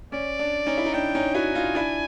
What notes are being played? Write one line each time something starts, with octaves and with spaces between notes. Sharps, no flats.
C#4 D5
D4
C#4 D#4
E4
D#4
D4 G5
C#4 D#4
E4 F#4 G#5
D#4 F4
D4 E4